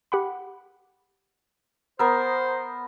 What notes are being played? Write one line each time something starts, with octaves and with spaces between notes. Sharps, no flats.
G4 F#5 B5
B3 A#4 C5 E6